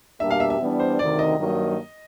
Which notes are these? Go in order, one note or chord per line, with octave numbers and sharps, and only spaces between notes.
B2 G3 A#3 D4 G4 E5
F5
E5
E5
E3 G3 B3 D4
C5
D2 C3 D#3 D5
D#5
G2 D#3 F#3 A#3 D#4